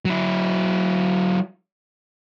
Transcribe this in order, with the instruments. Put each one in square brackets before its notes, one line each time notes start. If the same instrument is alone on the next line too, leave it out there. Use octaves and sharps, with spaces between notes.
[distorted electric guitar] F#3 E4